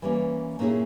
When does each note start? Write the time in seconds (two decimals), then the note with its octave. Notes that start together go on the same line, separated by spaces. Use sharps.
0.02 E3 G3 A#3 C#4
0.59 A#2 A#3 C#4 E4 G#4